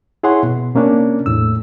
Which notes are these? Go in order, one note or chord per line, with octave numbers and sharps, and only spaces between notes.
E4 G#4 C#5 F#5 C6
B2
C3 A#3 C#4 D4
E2 A2 E6